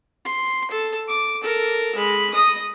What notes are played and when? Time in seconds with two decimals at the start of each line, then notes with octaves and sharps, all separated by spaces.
0.25 C6
0.71 A4
1.08 D6
1.42 A4 A#4
1.96 G#3 B5
2.34 D#5 D#6